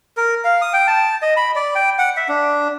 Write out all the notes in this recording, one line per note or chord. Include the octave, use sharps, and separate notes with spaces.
A#4
F5
D#6
G5
A5
D#5
B5
D5
G5
F#5
E5
D4